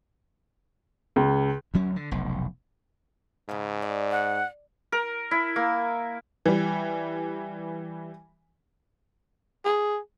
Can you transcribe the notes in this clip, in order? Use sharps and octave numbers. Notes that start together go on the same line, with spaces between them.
C#2
D2 F#3 C#4
D3
F1 B1
G#2 C#3 F5
D5
F#5
A#4
E4
A#3
E3 G3
G#4